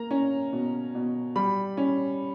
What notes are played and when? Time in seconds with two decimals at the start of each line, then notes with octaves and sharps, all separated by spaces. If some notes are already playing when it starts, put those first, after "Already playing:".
Already playing: A#3 A#5
0.11 C#4
0.53 B2
0.95 B2
1.36 G3 B5
1.77 C#4